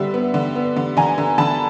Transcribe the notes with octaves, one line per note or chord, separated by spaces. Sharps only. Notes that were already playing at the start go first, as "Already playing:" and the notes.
Already playing: D3 G3 B3 E5
B3
D3
B3
D3
D3 G#5 A#5
D3
D3 A5 B5